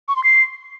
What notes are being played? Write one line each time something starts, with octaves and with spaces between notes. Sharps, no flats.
C#6
C6
C7